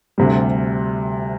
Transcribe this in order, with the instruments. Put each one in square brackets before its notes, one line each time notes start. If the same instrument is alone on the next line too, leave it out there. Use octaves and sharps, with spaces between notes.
[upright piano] D2 C3 G3